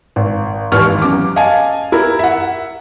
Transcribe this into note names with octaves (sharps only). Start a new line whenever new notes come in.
G#1
G#1 D#2 D#3 E3 C#6 F6
F#2 D6
D#5 F5 G#5 A5
E4 A#4
E5 F#5